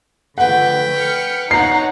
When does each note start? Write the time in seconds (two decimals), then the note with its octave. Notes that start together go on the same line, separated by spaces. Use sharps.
0.38 D3 F3 A3 B4 F#5 G5
0.95 F6 C#7
1.51 D#4 C#5 F#5 A#5 C7